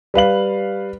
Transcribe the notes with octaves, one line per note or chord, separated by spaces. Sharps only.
G3 B4 F5 F#7